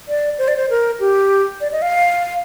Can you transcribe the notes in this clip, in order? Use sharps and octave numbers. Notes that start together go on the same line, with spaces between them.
D5
C5
D5
C5
A#4
G4
D5
D#5
F5